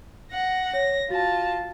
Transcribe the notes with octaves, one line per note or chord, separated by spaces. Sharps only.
F#5 A#6
C#5 A#6
F4 F#4 A5 A6 A#6